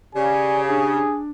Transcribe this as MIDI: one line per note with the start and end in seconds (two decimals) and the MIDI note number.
0.15 1.00 49
0.15 1.12 67
0.15 0.61 74
0.15 0.61 80
0.68 1.31 62
0.68 1.21 68